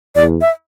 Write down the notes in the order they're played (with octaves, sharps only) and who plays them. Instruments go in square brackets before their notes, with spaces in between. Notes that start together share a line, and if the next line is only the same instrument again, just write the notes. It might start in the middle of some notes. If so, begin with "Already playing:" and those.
[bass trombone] E2 [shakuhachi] D5
[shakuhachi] E5